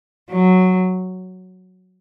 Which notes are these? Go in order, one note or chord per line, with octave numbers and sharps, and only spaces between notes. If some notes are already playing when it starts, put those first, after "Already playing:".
F#3